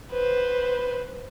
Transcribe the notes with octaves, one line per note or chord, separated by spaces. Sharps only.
B4 C5